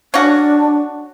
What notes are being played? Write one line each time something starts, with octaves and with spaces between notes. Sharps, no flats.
C#4 D4 F#4